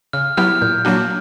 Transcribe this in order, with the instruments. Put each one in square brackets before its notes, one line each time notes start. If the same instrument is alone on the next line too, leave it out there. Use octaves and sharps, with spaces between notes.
[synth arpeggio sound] C#3 [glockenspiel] F6
[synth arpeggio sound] F#3 B3 E4 G4 [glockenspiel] F6
[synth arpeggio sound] A#2 [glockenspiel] G6
[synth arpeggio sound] F#3 A#3 D4 F#4